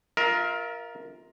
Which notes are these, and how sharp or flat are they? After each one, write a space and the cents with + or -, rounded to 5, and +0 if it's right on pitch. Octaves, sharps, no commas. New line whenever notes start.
F4 +0 A#4 +10 E5 -35